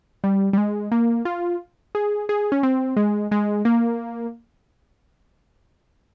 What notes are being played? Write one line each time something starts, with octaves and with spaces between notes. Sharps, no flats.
G3
G3
G#3
A#3
F4
G#4
G#4
C#4
C4
G#3
G#3
A#3